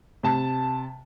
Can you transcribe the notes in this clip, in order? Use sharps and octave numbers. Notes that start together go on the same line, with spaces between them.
C3 A5